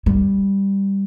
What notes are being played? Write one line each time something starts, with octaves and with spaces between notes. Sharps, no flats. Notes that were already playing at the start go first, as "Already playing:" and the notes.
G3